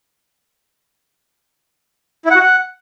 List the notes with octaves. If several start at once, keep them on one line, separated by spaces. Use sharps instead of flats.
E4
F#5
F#4
F#5